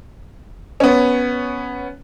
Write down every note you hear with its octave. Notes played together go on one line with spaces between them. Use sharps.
B3 C#4